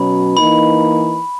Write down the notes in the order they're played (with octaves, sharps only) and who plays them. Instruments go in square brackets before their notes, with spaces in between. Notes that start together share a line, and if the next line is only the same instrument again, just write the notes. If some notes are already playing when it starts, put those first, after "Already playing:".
Already playing: [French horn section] B2 F#3 C#4 [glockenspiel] B5
[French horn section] E3 A#3 D#4 [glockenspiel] B5